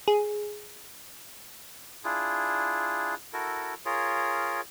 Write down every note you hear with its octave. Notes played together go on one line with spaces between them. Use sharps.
G#4
D4 E4 F4 G#4
E4 F#4 A4 A#4
F4 G#4 A#4 C#5